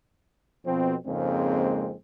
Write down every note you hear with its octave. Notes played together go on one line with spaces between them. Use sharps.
F2 B2 C4
F2 G#2 C#3 G#3 A#3 C4